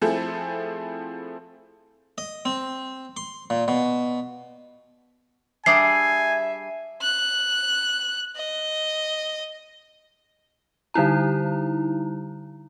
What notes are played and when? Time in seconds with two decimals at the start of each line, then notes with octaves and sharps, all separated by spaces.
0.02 F3 A3 C4 E4 G#4 A4
2.18 D#5
2.45 C4
3.17 C6
3.50 A#2
3.68 B2
5.66 G3 D4 G#4 E5 G#5 C7
7.02 F#6
8.36 D#5
10.94 D3 G3 D#4 E4 A#5